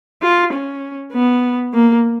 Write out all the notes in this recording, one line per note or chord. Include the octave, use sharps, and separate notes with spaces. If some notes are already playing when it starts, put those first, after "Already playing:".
F4
C#4
B3
A#3